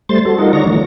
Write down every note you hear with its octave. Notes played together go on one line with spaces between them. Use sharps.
G3 A3 C5 C6 A6
F#4 A4
G3 D#4 F4 A#4 D#5 F#5
D3 C#5 D5 A#5 C#6 A#6
E3 F3 A3